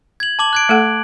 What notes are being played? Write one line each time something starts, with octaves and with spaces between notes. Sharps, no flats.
G#6 F#7
A5 D6 F#7
F#6 G#6 D7
A3 A4 F#5